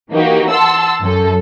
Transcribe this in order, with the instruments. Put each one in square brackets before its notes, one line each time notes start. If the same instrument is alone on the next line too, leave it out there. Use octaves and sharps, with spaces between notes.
[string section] E3 A#3 D#4 F#4 G4
F#5 A5 C6 E6
F#2 A4